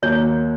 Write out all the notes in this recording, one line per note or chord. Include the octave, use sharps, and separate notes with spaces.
D#2 D#3 F#3 A#3 C#5